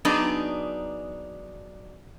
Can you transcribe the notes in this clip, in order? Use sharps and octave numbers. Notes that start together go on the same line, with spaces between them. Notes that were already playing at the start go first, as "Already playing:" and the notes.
F#3 B3 D4 D#4 G#4 D5